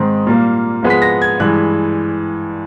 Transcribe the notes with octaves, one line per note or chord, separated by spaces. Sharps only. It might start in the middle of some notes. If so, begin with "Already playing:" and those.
Already playing: G#2 D#3 G#3 C4
A#2 G3 A#3
G#2 F3 G#3 B3
B6
A#6
G#6
G2 E3 G#3 F#6